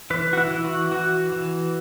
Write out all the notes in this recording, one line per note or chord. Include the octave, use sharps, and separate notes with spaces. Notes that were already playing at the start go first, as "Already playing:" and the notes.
E3 B4
F#4
E4
E3
F#4
E3 F#4
E3